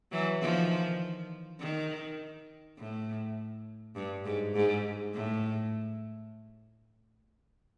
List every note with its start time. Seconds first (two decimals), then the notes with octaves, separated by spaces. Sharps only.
0.12 E3 F#3
0.41 D#3 F3
1.60 D#3
2.78 A2
3.96 G2
4.25 G#2
4.55 G#2
5.14 A2